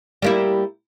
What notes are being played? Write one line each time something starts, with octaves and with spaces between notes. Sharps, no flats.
G3 A#3 E4